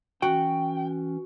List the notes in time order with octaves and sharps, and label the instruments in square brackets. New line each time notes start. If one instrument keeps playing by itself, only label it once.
[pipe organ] E3 C#4 [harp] F#4 [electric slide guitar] G5